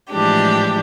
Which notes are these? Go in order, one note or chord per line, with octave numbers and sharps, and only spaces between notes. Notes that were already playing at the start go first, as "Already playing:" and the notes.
A2 E3 F3 G#3 D4 G4